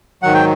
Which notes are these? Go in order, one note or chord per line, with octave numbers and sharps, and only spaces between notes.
G#2 D#3 F#3 F#5
G5